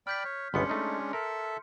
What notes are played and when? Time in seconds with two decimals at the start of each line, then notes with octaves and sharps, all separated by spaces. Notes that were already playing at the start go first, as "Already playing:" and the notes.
0.07 D5 G5 B5 F6 G6 B6
0.25 C#5
0.54 G1 C#2 G#3 B3 C#4 D4 C6 C#7
0.70 A3 D#4
1.13 A4 A#4 E5